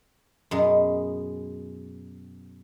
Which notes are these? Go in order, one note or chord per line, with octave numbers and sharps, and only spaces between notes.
F#2 B2 G#3